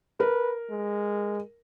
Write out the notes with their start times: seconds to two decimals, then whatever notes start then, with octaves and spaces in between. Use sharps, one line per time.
0.20 A#4 B4
0.70 G#3